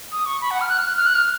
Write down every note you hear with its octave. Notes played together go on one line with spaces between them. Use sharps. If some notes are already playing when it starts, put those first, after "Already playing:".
D#6
C#6
B5
F#5
F6
F#6
F6
F#6
F6
F#6
F6